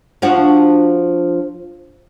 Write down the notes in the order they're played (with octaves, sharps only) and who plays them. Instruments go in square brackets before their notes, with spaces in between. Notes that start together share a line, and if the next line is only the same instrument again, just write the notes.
[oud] F3 D4 F#4